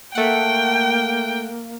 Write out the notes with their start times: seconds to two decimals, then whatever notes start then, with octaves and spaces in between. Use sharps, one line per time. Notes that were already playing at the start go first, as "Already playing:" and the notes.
0.15 A3 A#3 F#5 G5